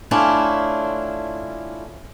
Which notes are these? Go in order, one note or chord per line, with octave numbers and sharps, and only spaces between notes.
A3 C#4 D4 E4 F4